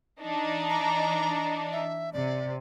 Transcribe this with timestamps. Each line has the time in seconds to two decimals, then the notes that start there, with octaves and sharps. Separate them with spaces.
0.22 E3 D4 D#4
0.70 A#5
1.72 E5
2.13 C3 D5